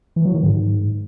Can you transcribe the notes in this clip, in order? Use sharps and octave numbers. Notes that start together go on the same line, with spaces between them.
E3
F#3
D#3
G#2